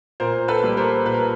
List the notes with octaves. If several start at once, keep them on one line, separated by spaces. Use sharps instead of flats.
A#2 A#4 C5
A4 B4
G3 A#3
A#4 C5
A#2 B4
A#4